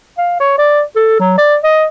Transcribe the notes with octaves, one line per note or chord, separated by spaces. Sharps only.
F5
C#5
D5
A4
F#3
D5
D#5